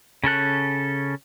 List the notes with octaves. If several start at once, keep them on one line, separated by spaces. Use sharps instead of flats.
C#3 C#4 A4 F#6